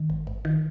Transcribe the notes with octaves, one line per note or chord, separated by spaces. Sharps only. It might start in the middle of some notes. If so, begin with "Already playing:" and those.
Already playing: D#3
G#1
G#1
D#3